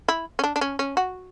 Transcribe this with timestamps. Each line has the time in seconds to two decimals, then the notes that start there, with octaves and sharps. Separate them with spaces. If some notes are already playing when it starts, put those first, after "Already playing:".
0.08 E4
0.39 C#4
0.44 D4
0.56 D4
0.61 C#4
0.79 C#4
0.97 F#4